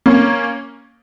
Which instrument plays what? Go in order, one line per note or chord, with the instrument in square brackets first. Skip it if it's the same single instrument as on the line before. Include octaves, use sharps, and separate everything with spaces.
[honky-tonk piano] A#3 C#4